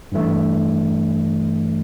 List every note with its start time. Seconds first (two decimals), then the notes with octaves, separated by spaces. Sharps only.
0.12 G2 E3 A3